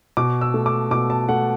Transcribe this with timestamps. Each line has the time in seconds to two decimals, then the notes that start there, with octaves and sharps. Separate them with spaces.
0.17 B2 D6
0.41 E6
0.54 A3
0.66 D6
0.91 B2 D6
1.10 A5
1.29 A3 F#5